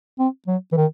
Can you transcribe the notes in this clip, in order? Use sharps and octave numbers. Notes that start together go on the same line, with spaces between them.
C4
F#3
E3
D#3